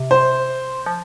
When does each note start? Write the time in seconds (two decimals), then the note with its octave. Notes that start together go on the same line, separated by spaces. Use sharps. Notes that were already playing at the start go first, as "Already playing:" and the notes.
Already playing: C3
0.11 C5
0.86 F3